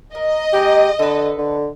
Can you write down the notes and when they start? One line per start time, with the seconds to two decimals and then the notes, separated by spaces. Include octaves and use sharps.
0.15 A#4 D#5
0.53 G#3 D#4 G4 F#5
0.99 D3 A4 B4
1.39 D3